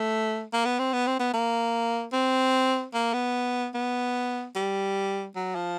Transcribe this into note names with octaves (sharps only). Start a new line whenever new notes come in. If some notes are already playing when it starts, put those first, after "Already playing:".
Already playing: A3
A#3
B3
C4
B3
C4
B3
A#3
C4
A#3
B3
B3
G3
F#3
F3